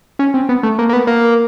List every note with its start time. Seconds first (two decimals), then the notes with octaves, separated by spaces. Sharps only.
0.19 C#4
0.34 C4
0.49 B3
0.63 A3
0.79 A#3
0.89 A#3
0.93 B3
1.07 A#3